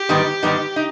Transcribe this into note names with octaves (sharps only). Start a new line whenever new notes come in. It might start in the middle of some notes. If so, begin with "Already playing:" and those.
Already playing: G4
G#2 D#3 G3 B3 D#4
G#2 D#3 G3 B3 D#4
D#4